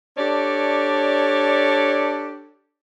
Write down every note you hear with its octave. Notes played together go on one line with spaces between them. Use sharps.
D4 G4 A4 C#5 D5